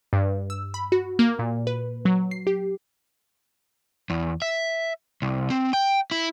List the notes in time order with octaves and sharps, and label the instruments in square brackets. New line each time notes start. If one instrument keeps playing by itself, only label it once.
[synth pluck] G2
E6
B5
F#4
A#3
A#2
B4
F#3
C7
G4
[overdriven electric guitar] E2
E5
C2
C4
G5
E4